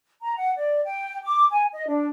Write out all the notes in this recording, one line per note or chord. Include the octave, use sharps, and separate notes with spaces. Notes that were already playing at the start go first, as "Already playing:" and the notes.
A#5
F#5
D5
G5
D6
G#5
D#5
D4